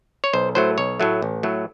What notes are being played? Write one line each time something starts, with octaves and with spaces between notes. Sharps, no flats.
C#5
B1 C5
A2 F#3 A3 C5
B1 C#5
A2 F#3 A3
A1
A2 F#3 A3